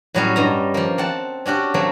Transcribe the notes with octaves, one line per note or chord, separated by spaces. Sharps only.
A2 F#3 G3 C#4
G2 D#5 A#5
F3 A#3
C4 F#5 A5
C#4 D4 F#4 G4
F#3 A3 A#3 C4